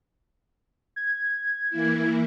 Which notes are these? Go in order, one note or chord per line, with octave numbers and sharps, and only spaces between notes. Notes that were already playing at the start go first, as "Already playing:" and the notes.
G#6
E3 A#3 E4